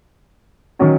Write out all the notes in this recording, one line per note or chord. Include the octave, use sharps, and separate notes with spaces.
D#3 F#3 C#4